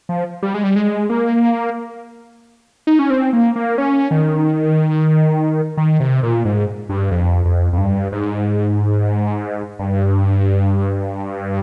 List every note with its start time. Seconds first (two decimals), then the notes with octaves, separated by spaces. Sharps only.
0.09 F3
0.42 G3
0.54 G#3
0.64 G3
0.76 G#3
1.09 A#3
2.87 D#4
2.99 C#4
3.10 C4
3.33 A#3
3.56 A#3
3.78 C#4
4.11 D#3
5.77 D#3
6.00 C3
6.23 A#2
6.45 G#2
6.89 G2
7.11 F2
7.45 F2
7.73 F2
7.78 G2
8.12 G#2
9.79 G2